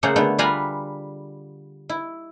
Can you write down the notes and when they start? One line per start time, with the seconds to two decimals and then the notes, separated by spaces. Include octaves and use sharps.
0.03 C#3 A3 A#3 G#4 C5 F#5
0.16 D3 A3 B3
0.39 G3 F4 B4 G#5 A#5 B5
1.89 E4